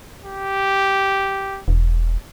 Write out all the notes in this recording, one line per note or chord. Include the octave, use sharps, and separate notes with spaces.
G4
E1